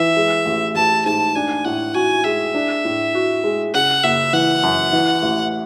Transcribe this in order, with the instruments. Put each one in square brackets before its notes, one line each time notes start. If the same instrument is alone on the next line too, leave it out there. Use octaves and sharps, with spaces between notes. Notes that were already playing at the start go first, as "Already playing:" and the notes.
Already playing: [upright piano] E3 [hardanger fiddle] E5
[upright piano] G#3
A1
[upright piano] A1 [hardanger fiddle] A5
[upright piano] G#2 [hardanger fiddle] A5
[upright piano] D4 [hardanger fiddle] G#5
[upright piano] A2 [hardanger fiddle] F#5
[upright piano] F#4 [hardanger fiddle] G#5
[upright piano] G#3 [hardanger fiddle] E5
[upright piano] D4
A2
F#4
G#3
[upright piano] C#3 [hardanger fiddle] F#5
[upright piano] F#1 [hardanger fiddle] E5
[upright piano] E3 [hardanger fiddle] F#5
[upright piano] F#2
E3
A1